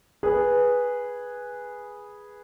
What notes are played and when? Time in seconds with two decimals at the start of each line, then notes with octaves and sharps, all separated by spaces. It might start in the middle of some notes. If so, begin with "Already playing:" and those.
0.23 G#4 B4